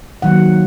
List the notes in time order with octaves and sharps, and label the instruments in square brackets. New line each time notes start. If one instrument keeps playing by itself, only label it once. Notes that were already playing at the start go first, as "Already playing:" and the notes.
[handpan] D#3 F#3 A#3 F#5